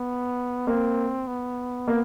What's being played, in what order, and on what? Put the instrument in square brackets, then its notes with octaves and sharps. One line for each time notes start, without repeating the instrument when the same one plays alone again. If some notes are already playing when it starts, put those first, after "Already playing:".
Already playing: [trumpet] B3
[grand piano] A#3 [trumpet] C4
[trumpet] B3
[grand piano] A#3